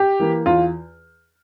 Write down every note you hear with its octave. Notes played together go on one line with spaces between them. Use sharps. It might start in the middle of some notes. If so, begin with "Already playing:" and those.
Already playing: G4
E3 A#3
E2 F4